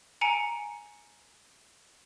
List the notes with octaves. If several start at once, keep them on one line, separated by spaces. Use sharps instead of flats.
G#5 A#5 C#7 D7